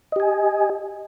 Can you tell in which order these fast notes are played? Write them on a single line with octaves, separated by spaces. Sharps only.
D#5 G4 G#5